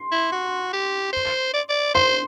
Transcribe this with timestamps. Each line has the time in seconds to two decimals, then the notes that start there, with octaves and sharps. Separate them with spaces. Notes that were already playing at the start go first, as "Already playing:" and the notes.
Already playing: C6
0.12 E4
0.32 F#4
0.73 G4
1.13 C5
1.53 D5
1.69 D5
1.94 C5 C6